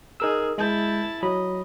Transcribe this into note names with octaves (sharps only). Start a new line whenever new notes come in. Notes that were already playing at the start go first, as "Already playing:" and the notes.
D#4 G#4 A#4 E6
G#3 E4 A5 G6
F#3 D#5 B5